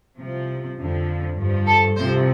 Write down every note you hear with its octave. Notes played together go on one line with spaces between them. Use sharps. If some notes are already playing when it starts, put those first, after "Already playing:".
C2 C3 F3
F2 D3 F3
G2 F3
A4
C2 C3 F3 C5